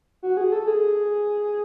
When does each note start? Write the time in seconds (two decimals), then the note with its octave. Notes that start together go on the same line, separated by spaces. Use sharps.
0.23 F#4
0.37 G#4
0.52 A4
0.67 G#4